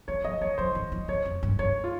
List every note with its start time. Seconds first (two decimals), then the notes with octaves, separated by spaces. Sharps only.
0.08 D#3 C#5
0.24 F3 D#5
0.41 D#3 C#5
0.58 F3 C5
0.75 D#3
0.92 F3
1.08 D#3 C#5
1.25 F2
1.43 G2
1.59 G2 C#5
1.84 F4